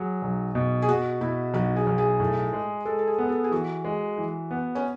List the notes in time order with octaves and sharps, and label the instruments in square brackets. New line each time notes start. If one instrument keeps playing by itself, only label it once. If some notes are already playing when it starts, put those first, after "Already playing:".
Already playing: [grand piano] F#3 [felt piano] G#4
[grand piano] B1
B2
[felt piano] G#4
[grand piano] B2 [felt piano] F#4
[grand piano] B2 [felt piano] E4
[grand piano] B1 [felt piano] F#4
[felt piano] G#4
[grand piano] B1
[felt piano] G#4
[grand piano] A2
G#3
[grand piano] G#3 [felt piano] A4
[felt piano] A4
G#4
[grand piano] B3
[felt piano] A4
G#4
[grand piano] E3 [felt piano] F#4
[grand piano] G#3
E3
B3
[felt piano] C#4